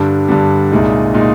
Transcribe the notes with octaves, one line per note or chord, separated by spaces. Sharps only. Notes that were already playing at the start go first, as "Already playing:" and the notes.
Already playing: G2 D3 G3
G2 D3 G3
C2 A#2 G#3 D#4
A#2 G#3 D#4